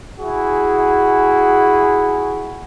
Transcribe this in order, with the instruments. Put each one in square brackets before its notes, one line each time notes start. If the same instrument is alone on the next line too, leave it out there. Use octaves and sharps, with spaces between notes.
[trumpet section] E4 F#4 G#4